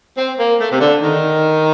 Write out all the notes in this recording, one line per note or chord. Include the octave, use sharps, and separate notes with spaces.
C4
A#3
A3
C3
D3
D#3